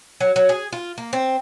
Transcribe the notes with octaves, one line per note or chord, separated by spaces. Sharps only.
F#3
F#3
G#4
F4
A#3
C4